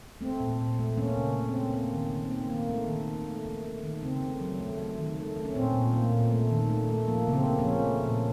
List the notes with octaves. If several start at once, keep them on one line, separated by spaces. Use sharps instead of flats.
A3 C4
A#2
A#2
A3
A3 A#3 C#4
C#3
A3
C4
A3
A#3 C4
D#3
D#3
C4
A#3
D#3 A#3
A3
D#3
D#3
A3
A3
A3
D#3
C#3 C4
A3
F#3
A3
A3
D#3
A3
A3
C#4
A#2 C4
A#2
A#3
A#2
A3
D#3
A3
A3
F3 A#3
C#3 A#3
C4
C#3
A#3 C#4
F3
A3
A#2